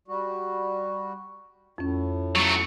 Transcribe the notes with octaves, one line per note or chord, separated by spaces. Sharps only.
G3 F#4
F2 A2 C#4
F#3 A3 C#6 A6